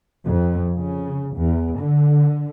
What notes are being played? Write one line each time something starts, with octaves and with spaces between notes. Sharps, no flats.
F2
C#3
E2
D3